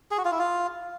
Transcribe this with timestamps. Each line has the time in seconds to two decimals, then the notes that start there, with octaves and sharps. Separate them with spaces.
0.11 G#4
0.18 F#4
0.25 F4
0.32 E4
0.39 F4